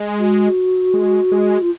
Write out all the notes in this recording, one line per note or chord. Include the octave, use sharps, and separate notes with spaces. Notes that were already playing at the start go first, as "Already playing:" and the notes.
Already playing: G#3
F#4
G#3
G#3
F4